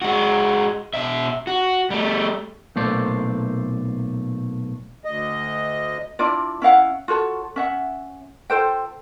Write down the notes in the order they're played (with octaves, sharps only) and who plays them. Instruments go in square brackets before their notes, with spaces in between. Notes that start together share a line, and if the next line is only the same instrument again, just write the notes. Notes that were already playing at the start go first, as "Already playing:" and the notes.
[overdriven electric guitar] G#3 F#4
B2 E5
F#4
G3 A3
[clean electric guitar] B1 A#2 A3 C5 D5
[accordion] D2 D#5
[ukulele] D4 E4 F4 D5
C#4 E4 F5 F#5
F4 F#4 A4 C#5
C#4 E5 F#5
F4 A4 C5 G5